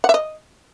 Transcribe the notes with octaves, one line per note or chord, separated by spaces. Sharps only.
F#5
E5
D#5